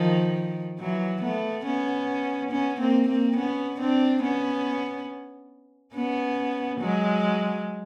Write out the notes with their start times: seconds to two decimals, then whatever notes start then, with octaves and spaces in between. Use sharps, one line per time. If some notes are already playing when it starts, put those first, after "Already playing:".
Already playing: D#3 F3
0.79 E3 F#3
1.22 A3 B3
1.65 B3 C#4
2.51 B3 C#4
2.80 A#3 C4
3.08 A#3 C4
3.37 B3 C#4
3.81 C4 D4
4.23 B3 C#4
5.94 B3 C#4
6.80 F#3 G#3